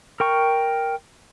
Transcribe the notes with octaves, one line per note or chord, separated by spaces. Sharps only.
A#4 G5 C#6